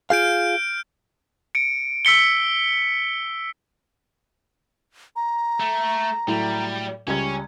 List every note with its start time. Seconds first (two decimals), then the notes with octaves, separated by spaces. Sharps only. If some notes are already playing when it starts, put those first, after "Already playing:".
0.10 F4 G#4 F5 F6 G6 D7
1.55 C#7 D7
2.05 E6 B6 C#7 G7
5.16 A#5
5.60 A3
6.28 A2 F#3 G3 E4
7.07 C#2 G3 C#4 G#6